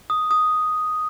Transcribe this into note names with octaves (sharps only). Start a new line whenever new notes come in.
D#6
D#6